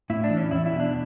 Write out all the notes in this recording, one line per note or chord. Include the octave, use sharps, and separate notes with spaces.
A2 E4
D4
E3
C#4
E2 E4
E4
B2
D4